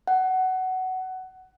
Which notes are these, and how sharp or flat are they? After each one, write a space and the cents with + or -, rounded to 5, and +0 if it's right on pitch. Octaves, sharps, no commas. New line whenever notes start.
F#5 +15